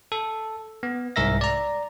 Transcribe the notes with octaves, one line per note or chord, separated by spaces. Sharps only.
A4
B3
C2 G#2 A#4 E5 A#6
D5 A#5